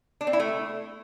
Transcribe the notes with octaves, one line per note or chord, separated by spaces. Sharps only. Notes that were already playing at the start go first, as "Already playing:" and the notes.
D4
C4
E4
A3